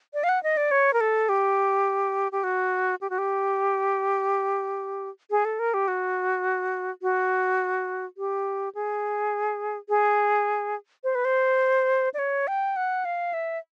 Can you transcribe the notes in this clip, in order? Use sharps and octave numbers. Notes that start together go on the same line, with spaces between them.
D5
F5
F#5
D#5
D5
C#5
A#4
A4
G4
G4
F#4
G4
F#4
G4
G#4
A4
A#4
G4
F#4
F#4
G4
G#4
G#4
C5
B4
C5
D5
C#5
G5
F#5
F5
E5